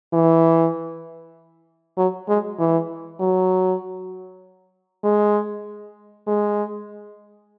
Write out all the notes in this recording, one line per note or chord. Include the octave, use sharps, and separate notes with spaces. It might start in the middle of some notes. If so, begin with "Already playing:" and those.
E3
F#3
G#3
E3
F#3
G#3
G#3